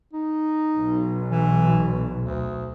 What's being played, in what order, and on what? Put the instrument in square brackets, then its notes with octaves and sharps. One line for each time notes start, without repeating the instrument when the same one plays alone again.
[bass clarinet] D#4
[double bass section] B1
[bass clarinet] E3
D2